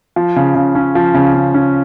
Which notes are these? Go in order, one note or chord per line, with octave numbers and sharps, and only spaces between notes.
F3
C#3
C#3
C#4
F3
C#3
C#3
C#4